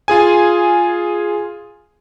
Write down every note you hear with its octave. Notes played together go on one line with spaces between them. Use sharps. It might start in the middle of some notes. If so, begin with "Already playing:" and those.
F4 G#4 G#5